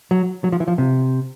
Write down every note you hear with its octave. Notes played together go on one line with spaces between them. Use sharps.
F#3
F#3
F3
E3
F3
C3